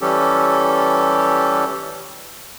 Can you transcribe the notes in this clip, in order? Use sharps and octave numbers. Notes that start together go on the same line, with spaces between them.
E3 G3 C#4 G4 A4